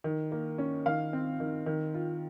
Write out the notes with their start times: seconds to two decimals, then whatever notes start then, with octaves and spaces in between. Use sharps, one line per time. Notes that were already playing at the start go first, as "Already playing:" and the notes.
0.04 D#3
0.32 A#3
0.58 C#4
0.86 D#3 F5
1.13 C4
1.40 D#3
1.66 D#3
1.94 F4